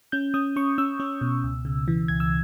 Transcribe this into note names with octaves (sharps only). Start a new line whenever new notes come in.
C#4 G6
C#4 D#6
C#4 C#6
C#4 E6
C#4
B2
C#2
C#3
E3
C#2 G#6
E6